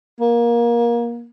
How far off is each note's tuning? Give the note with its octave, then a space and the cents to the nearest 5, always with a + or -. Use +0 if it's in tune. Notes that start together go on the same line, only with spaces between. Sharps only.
A#3 +20